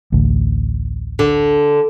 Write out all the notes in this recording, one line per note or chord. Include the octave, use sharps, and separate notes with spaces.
A1 D2
D3